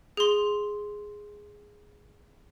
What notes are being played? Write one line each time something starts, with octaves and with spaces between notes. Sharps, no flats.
G#4 C6